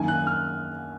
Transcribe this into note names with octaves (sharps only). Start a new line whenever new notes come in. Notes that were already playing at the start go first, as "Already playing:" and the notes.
Already playing: F#2 D#3 A#3 D#4 G#5
F#6
F6